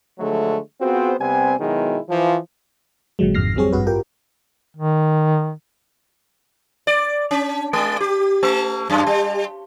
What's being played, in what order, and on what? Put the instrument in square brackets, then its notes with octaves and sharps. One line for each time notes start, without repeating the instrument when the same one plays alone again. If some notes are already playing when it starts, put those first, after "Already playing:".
[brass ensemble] D3 F3 F#3 G#3 A3
B3 C4 F4 F#4 G#4 C5
C3 G3 B3 C4 G#5
B2 D#3 F#3 G#3 B3 E4
E3 F3
[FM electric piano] G#1 A#2 D3 F#3 G#3
G#1 F2 G#2 F6 A#6 C7
F2 F#3 G3 C4 G#4 C#5
A1 G2 F#4 B4
F4 G4 A#4 G5
[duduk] D#3
[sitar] D5
C#4
G#3
G4
A3
F#2
G3